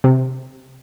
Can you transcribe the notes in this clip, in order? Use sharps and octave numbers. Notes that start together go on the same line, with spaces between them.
C3